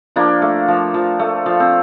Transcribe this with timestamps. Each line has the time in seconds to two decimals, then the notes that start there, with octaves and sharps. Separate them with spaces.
0.16 F3 A#3 D4
0.42 A3
0.68 F3
0.94 F3
1.19 A3
1.46 F3
1.60 C4